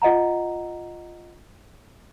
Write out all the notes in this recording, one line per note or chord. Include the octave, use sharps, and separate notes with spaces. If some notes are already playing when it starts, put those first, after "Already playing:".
F4 D#5 F#5 A#5